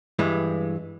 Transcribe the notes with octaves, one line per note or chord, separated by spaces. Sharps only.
G2 E3 G#3